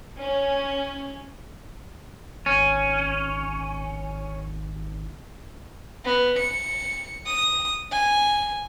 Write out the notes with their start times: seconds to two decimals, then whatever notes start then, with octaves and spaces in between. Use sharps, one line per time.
0.17 C#4
2.46 G#1 C#4
6.05 B3
6.39 C#7
7.26 D#6
7.92 G#5